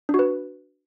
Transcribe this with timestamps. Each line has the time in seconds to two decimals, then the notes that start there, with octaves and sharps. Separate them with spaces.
0.09 D4
0.14 F#4
0.19 B4